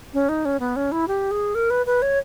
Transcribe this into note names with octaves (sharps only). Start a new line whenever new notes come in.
C#4
D#4
C#4
B3
C#4
E4
G4
G#4
A#4
B4
B4
C#5